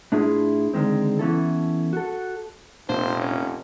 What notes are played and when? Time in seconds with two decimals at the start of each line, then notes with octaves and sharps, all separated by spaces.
0.12 A2 D4 E4 F4 G#4
0.73 C#2 D3 D#3 G#3 C4
1.19 E3 B3 C#4 E4 A4
1.93 F#4 A4
2.89 F1 A#2 A#3 D4 C5
3.20 C#4